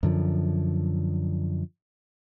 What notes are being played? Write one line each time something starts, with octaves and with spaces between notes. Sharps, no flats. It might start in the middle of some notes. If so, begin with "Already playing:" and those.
F#2 D3 F3